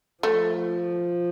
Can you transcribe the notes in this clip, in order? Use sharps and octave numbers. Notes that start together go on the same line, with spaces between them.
F3 A3